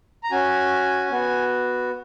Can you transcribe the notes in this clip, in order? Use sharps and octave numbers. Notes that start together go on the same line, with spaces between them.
A#5
C#4 F#4 G#5
B3 F#4